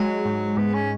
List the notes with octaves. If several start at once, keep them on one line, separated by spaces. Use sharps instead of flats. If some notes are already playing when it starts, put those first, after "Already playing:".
Already playing: F#3 G#3
G#2
G#2 B3
C#4